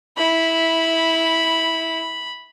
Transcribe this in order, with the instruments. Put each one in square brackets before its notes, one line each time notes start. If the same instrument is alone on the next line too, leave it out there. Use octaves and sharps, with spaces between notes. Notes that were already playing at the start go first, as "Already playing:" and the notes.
[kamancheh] E4 [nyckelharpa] B5